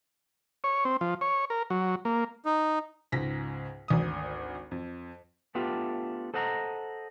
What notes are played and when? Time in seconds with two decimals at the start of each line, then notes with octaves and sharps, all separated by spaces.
0.64 C#5
0.85 C4
1.01 F3
1.21 C#5
1.50 A#4
1.70 F#3
2.05 A#3
2.46 D#4
3.12 C#2 G#2 A#6 B6
3.88 G#1 D2 D#6
4.71 F2
5.55 A3 B3 D4 F4 G4
6.34 A4 C5 D#5 F#5 G5 A#5